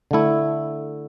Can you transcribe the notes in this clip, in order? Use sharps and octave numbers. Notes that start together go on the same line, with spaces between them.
D3 A3 E4